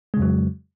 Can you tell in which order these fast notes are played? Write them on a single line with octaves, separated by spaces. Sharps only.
G#3 C#3 F2 F#3